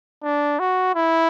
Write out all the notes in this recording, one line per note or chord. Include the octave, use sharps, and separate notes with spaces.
D4
F#4
E4